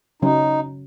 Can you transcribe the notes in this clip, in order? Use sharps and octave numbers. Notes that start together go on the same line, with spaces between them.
C#3 F#3 C#4 D#4